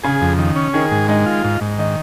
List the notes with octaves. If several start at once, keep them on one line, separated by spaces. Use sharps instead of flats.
C#3 G#4
F2
D#3
C#4
D#3 G#4
G#2
G#3 D#4
F4
G#2
G#2
D#3 D#4